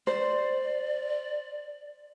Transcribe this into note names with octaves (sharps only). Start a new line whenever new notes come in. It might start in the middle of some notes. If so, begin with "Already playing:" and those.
C5 D5